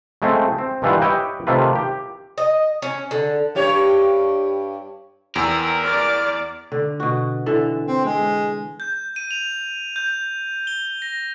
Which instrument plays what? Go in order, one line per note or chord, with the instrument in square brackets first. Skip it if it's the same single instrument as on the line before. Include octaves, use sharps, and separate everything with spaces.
[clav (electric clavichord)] C#3 G#3 A3 C4 G#4
C4
G2 D#3 E3 G3 F4 F#5
G4 B4 C#5 D#5 E5 G5
C3 D#3 A3 F4 B4
G4
[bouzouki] D#5
C#4
D3
[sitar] G2 G4 C#5
[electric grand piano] E2 E6 [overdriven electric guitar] A#4 [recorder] G5
[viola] D5 [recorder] F6
[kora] D3
B2 F#4
D3 E3 A4
[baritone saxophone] C4
G#3
[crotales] G6
D#7
F7
G6
G7
A#6